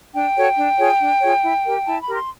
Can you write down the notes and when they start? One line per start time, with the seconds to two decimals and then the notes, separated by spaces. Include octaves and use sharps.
0.14 D4 G5
0.36 F#4 A4 C#5
0.57 D4
0.78 F4 G#4 C#5
1.00 D4
1.22 F4 G#4 C#5
1.43 E4
1.64 G4 A#4
1.87 E4 A5
2.01 B5
2.08 G4 A#4
2.14 C6